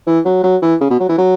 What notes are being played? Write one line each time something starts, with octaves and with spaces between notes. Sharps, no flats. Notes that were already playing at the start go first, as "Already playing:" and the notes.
E3
F#3
F#3
E3
C#3
B2
F#3
E3
F#3